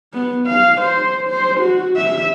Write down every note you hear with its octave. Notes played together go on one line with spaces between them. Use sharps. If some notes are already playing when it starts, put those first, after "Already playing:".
B3
F5
C5
C5
F#4
E5